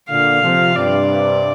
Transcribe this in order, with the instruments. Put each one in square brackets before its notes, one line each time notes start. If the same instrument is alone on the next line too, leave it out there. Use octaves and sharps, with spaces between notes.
[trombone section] A#2 D3 [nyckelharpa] F5
[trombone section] C3 F3
[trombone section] G2 C3 [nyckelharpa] D5